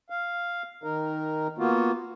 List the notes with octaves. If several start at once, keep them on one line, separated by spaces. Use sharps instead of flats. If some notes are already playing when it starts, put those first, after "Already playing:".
F5
D#3 D#4 A#4
A#3 B3 F4 F#4